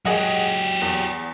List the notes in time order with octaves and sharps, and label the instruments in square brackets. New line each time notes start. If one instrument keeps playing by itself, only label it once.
[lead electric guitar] F#3 G4 [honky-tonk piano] G#4 D#5 F#5
[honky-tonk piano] E2